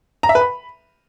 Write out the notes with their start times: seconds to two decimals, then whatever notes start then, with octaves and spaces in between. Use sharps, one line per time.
0.23 A#5
0.29 E5
0.35 B4
0.41 B5